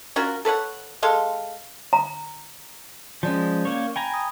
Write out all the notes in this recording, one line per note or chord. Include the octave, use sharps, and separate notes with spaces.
C#4 F4 F#4 A#4
A4 B4 C#5 F#5
G#3 A4 F5 C6
A#5
F3 G#3 C#4 D5 G6
A#3 C#5
G5 G#5 A#5 B5
D#6